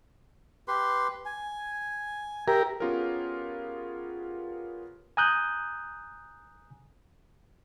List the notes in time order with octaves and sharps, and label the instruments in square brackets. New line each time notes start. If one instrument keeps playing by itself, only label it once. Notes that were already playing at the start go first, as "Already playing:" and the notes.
[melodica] G4 B4 C6
G#5
[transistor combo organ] G4 A#4 [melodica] E5
[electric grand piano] B3 C#4 F4 G4 G#4 A#4
[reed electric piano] G#5 A#5 D#6 F#6 G6